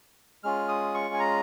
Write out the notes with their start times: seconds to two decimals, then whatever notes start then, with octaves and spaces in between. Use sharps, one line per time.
0.44 G#3 C#4 F4 F6
0.68 D#6
0.94 C#6
1.14 G#5
1.20 A#5